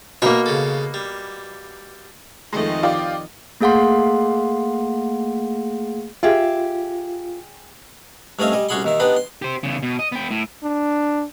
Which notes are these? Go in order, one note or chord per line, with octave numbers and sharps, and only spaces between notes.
B2 A#3 A#4 E5 G5
C#3 A4
G3
F2 D#3 G#3 A3 D#5
F4 G4 D5
A3 A#3 G#4 F5 F#5 C6
F4 G4 G#4 E5
G2 A3 C4 C#4 D#5 F5
G3 D#5 G#5
C2 C#4 F#4 G#4 B5 C6
D#2 D#3 E5
B3 D4 D#4 G4 B4
C6
G4 C5
E2 C#3
B2
D#5
B3 G5
A2
D4